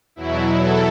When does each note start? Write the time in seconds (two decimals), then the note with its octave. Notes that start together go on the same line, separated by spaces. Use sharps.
0.16 E2 B2 F#3 E4
0.58 A4